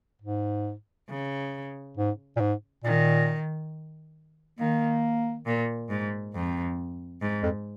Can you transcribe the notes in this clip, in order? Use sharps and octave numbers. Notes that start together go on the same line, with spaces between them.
G#2
C#3
G#2
A#2
G#2
A#2 D#3
D#3 A#3
A#2
G#2
F2
G#2
F2